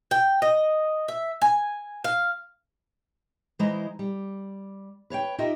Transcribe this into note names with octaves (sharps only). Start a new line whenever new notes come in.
G5
D#5
E5
G#5
F5
E3 G#3 E4 C5 D#5 A#5
G3
B4 C#5 F5 G5
D#4 F4 G4 A#4 D#5 E5